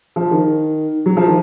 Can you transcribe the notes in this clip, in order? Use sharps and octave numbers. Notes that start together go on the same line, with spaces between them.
F3
D#3
F#3
F3
D#3